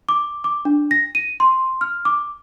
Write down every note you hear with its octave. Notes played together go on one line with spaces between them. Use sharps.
D6
D6
D4
A#6
D#7
C6
F6
D6